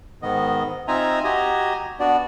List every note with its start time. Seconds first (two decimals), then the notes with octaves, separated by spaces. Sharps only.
0.22 G#2 D#3 B3 D#5
0.88 C4 D#4 F4 E5 G#5 A#5
1.24 F#4 G4 D#5 G#5 A#5
2.00 B3 D4 F#4 D5